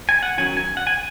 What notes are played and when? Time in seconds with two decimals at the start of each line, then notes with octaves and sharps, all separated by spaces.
0.09 G#5
0.23 F#5
0.37 D#3 F#3 C#4 G#5
0.57 G#5
0.77 F#5
0.87 G#5